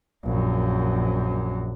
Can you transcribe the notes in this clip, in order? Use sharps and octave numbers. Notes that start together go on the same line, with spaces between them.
A#1 F#2